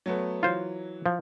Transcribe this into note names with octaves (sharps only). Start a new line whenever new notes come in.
F#3 A3 B3
E3 F#3 F4 C5
F3